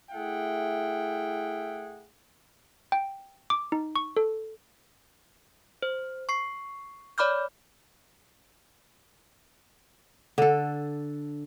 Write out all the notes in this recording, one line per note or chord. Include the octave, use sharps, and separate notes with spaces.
A3 E4 G#4 E5 F#5 G5
G5
D6
D#4
C#6
A4
C5
C#6 C7
C#5 D5 B5 D6 F6 G6
D3 A4